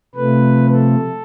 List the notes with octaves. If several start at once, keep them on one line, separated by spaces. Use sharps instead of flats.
C3 F3 A3 B4
A4